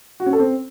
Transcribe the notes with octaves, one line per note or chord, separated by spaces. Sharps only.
F#4
C#4
A4
C4